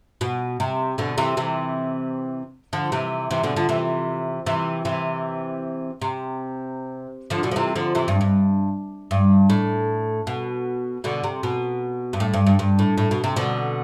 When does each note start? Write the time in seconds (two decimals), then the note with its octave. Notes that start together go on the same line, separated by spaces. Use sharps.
0.21 B2
0.60 C3
0.98 B2 D3
1.18 C3 E3
1.37 C3 E3
2.73 D3 F3
2.92 C3 E3
3.31 C3 E3
3.43 B2 D3
3.56 D3 F3
3.69 C3 E3
4.46 C3 E3
4.85 C3 E3
6.01 C3
7.30 D3 F3
7.43 B2 D3
7.51 F3
7.56 C3 E3
7.75 D3 F3
7.95 C3 E3
8.08 G2
8.21 G2
9.11 G2
9.50 A2
10.27 B2
11.04 B2 D3
11.24 C3
11.43 B2
12.13 G2
12.20 A2
12.34 G2
12.47 G2
12.59 G2
12.79 A2
12.98 A2
13.11 B2
13.24 C3
13.36 B2 D3